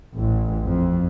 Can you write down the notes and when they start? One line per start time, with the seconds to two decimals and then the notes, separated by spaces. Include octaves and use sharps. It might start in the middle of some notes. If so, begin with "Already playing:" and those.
0.16 A1
0.64 F2